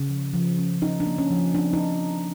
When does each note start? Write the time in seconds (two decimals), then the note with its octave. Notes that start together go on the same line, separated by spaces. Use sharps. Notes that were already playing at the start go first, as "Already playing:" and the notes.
Already playing: C#3
0.09 F3
0.34 F3
0.58 C#4
0.82 C#4 D#4
1.00 D4
1.06 A#3
1.18 C#4
1.31 F3
1.54 C4 D4
1.73 D#4